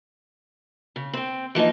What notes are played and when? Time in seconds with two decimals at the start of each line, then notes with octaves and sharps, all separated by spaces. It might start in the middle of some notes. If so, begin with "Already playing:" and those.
0.96 C#3
1.13 C4 G5
1.55 E3 F3 A#3 D#4